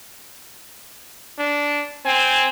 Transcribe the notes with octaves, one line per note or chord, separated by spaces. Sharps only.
D4
C4 G#5